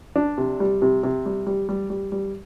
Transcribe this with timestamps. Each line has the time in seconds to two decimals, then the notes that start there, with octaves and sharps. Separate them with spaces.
0.16 D4
0.38 C3
0.60 G3
0.82 C3
1.03 C3
1.26 G3
1.47 G3
1.69 G3
1.90 G3
2.12 G3